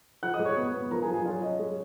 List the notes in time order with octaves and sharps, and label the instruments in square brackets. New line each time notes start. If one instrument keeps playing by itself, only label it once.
[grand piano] F3 F#5 F#6
D#5 D#6
G#3
C#5 C#6
B3
B3
F3 A#4 A#5
G#4 G#5
F3
G#4 G#5
F#3 F4 F5
C#4 D#5
G#3